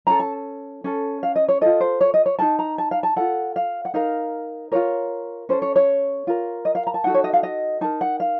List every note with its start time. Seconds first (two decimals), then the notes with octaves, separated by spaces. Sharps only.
0.07 C#4 A4 A#5
0.20 A5
0.84 C#4 A4
1.23 F5
1.36 D#5
1.48 C#5
1.61 F4 A4 D#5
1.80 C5
2.01 C#5
2.14 D#5
2.26 C#5
2.39 D#4 A#4 A5
2.59 A#5
2.78 A5
2.91 F5
3.03 A5
3.16 F4 A4 F#5
3.56 F5
3.85 F#5
3.94 D#4 A#4 F5
4.72 F4 A#4 C#5
5.49 C#4 A4 C5
5.62 C#5
5.76 C#5
6.27 F4 A#4
6.65 D#5
6.75 F5
6.87 A#5
6.94 A5
7.04 D#4 F#4 A4 F#5
7.14 C#5
7.24 D#5
7.33 F5
7.43 D#5
7.81 D#4 A#4 A5
8.01 F#5
8.20 F5